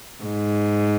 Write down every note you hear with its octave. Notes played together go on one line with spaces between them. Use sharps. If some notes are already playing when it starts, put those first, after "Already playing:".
G#2